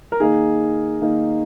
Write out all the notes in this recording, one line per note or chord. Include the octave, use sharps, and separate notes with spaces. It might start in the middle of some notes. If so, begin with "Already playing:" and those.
A#4
D#3 A#3 D#4 G#4
D#3 A#3 D#4